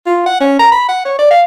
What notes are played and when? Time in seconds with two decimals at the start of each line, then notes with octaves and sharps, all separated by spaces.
0.06 F4
0.26 F#5
0.40 C#4
0.59 A#5
0.72 B5
0.88 F#5
1.05 C#5
1.19 D5
1.31 F5